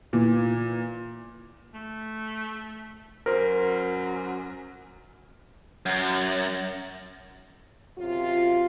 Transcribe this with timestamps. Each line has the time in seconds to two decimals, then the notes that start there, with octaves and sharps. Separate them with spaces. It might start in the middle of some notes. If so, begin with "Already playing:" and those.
0.13 A#2 E3
1.74 A3
3.26 F#2 A#4 C5
5.86 F#2
7.97 F#2 C3 F4